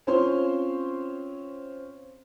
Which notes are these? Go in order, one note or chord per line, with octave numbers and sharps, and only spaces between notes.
C4 C#4 F4 C5 C#5 C6